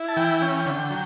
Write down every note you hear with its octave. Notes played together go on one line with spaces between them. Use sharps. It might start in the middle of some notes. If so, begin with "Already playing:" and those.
Already playing: E4
A5
E3 G5
C#4
D3
F#3